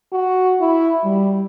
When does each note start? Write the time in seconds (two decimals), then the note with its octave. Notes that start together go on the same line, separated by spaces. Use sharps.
0.13 F#4
0.60 E4
1.04 G3